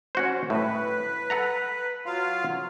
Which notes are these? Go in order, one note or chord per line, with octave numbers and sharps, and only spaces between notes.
C#4 F#4 C5
A2 B4
A4 F#5 A#5
F#3 F4 F5